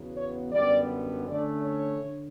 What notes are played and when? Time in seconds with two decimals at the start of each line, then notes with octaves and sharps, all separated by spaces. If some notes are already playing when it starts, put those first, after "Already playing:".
Already playing: E2 C#3 F#3 B3
0.16 C#5
0.52 F#2 D3 G3 B3 D5
1.26 D3 A3 C#4 D5
1.63 C#5
2.00 D3